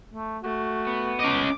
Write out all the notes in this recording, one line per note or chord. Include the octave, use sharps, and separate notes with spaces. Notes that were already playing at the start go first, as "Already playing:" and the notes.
A3
A3 F#4
B3
C#4 D#5 D6